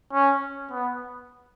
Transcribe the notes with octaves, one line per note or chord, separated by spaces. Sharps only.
C#4
B3